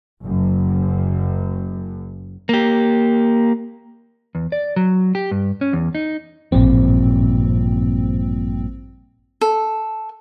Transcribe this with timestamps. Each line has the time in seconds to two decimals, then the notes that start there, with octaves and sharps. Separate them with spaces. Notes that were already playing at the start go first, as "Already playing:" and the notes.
0.23 F#1 F#2
2.49 A#3 G4
4.35 E2
4.52 D5
4.76 F#3
5.15 G4
5.31 G2
5.61 C#4
5.73 E2
5.95 D#4
6.52 A1 G2 A#2 F3 C4
9.41 A4